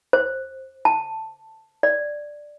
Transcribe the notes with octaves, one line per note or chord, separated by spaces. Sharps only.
C5
A5
D5